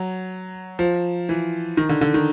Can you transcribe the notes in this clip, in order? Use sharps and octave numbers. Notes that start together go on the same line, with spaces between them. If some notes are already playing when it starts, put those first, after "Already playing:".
Already playing: F#3
F3
E3
D#3
D3
D3
D#3